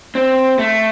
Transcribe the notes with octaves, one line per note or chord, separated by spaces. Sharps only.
C4
A3